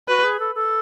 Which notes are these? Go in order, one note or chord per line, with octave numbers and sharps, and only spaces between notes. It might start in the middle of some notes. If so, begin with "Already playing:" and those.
F#4 B4
G#4
A4
A4